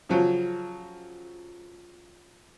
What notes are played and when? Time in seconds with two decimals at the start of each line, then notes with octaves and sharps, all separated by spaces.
0.09 C#3 F3 F#3